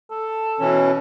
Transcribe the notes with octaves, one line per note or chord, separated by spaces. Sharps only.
A4
B2 E3 C#4